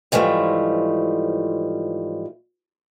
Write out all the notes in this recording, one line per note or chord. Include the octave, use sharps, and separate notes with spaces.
G#2 E3 F3 G3 A3